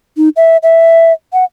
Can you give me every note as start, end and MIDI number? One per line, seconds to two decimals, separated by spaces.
0.17 0.29 63
0.36 0.57 76
0.63 1.12 76
1.33 1.44 78